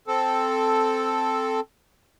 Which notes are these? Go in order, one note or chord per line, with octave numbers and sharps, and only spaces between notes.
C4 A4